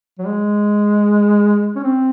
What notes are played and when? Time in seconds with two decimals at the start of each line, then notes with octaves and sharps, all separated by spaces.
0.19 F#3
0.27 G#3
1.75 C#4
1.83 C4